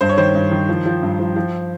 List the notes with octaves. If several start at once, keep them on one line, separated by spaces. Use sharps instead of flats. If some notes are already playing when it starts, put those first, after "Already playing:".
G2 C5
C#5
D#3 C5
G2
D#3
F3
F3
G2
F3
F3